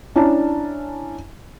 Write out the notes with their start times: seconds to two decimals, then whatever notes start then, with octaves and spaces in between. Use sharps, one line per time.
0.16 C#4 D4 E4 D5 A5 A#5